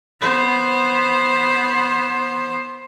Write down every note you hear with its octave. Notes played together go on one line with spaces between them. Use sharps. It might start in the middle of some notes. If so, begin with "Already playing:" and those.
B3 C5